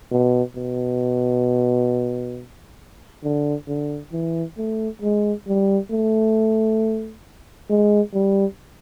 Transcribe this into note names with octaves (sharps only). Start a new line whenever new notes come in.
B2
B2
D3
D3
E3
A3
G#3
G3
A3
G#3
G3